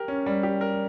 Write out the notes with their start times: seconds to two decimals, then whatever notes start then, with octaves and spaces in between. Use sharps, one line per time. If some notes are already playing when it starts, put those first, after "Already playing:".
Already playing: G4 A#4
0.08 C#4
0.26 G3
0.43 G4
0.61 A#4